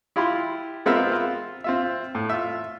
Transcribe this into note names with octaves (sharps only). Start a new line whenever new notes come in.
E4 F4 G4 B5 C6
G#3 B3 C4 F4 A#4 E5
F4
C4 F4 E5
A2
F4 E5